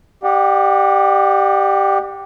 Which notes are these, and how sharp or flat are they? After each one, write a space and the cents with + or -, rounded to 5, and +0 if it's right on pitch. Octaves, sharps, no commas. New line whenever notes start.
G4 +0 D5 +40 F#5 -25